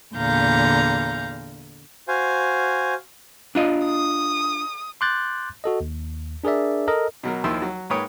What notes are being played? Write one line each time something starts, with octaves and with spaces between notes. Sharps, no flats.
E2 A#2 D3 F5 A#5 G6
F#4 C5 F5 G#5
D4 F4 D#5
D#6
C6 D6 F#6 G6 A6
F#4 A4 D#5
D#2
D4 G#4 A#4 D5 E5
A4 A#4 D#5
B2 F#3 A#4
D#2 D#3 F3 E4 C6 E6
F#3
G#2 A#3 B4 C#5 G5 D#6